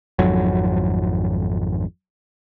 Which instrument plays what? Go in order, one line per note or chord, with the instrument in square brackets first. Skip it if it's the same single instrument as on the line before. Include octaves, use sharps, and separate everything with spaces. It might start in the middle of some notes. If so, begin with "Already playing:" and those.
[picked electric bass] G#1 F2 F#3